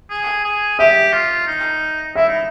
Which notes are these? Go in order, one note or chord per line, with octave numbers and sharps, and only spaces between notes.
G#4
G#4
G4 E5
F4
D#4
E4 E5
D#4